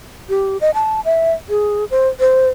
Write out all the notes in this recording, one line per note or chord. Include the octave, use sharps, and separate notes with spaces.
G4
D#5
A5
E5
G#4
C5
C5